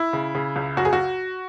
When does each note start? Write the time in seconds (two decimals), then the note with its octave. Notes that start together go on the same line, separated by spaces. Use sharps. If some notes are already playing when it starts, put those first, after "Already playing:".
Already playing: E4
0.13 C#3
0.35 C#3
0.56 C#2
0.77 F#2 F#4
0.85 G#4
0.93 F#4